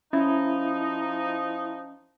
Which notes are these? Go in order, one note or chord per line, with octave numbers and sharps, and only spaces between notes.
F3 C#4 D#4 E4